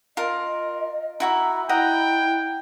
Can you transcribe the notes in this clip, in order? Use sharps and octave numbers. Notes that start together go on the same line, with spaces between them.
F4 A#4 D#5
E4 F#4 E5 A#5
E4 D#5 F#5 G5 A#5